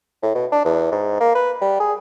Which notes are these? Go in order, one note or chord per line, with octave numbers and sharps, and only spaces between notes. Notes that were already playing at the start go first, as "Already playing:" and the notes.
A2
B2
D4
E2
G#2
A#3
B4
G3
G#4